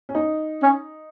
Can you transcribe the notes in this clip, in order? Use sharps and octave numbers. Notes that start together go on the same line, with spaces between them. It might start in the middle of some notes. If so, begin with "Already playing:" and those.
C#4
D#4
C#4